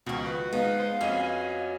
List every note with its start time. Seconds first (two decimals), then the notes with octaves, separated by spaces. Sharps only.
0.06 C#2 B2 D#3 F3 F#4
0.26 B4
0.53 G#3 B3 D#4 F5
0.79 C5
1.01 F2 C#4 F#4 D#5 G#5 D#7